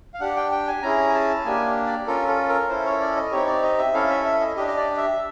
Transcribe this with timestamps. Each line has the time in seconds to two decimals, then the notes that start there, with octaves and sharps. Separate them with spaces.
0.14 F5
0.20 D4 G4 F#5
0.36 G5
0.52 G5
0.68 G#5
0.82 C#4 E4 G#4 A#5
1.09 G#5
1.14 A5
1.45 A#3 D4 G4 G#5
1.86 D5
2.07 C#4 F4 A4 A#4
2.28 A4
2.49 A#4
2.69 C#4 E4 A4 C5
2.85 C#5
3.00 D5
3.16 D#5
3.31 C4 D#4 G4 C#5
3.47 D5
3.63 D#5
3.78 E5
3.94 C#4 E4 A4 F5
4.09 E5
4.25 E5
4.40 D#5
4.56 D4 G4 D#5
4.68 D#5
4.77 D5
4.98 E5